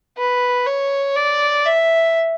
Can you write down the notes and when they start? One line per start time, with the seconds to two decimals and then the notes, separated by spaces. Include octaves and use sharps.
0.18 B4
0.67 C#5
1.16 D5
1.66 E5